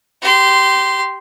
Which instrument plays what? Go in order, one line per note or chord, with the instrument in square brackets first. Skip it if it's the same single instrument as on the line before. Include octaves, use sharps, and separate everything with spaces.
[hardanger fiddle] G4 C6